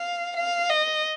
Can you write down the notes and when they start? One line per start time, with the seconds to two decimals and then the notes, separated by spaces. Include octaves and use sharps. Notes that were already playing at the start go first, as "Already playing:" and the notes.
Already playing: F5
0.36 F5
0.69 D#5